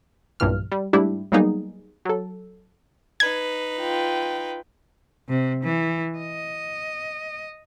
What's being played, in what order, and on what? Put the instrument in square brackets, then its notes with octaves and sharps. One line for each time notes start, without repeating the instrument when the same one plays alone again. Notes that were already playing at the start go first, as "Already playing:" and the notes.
[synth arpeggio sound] B1 G2 A#2 E3 F6
G3
G#2 G3 A3 D4 E4 G4
F#3 G3 A#3 B3 D#4 G#4
F#3 A4
[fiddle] D#4 B4 [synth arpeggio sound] G#6
[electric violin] F4 G5
[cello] C3
E3
D#5